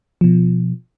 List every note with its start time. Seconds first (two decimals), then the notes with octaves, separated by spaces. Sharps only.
0.21 B2 F3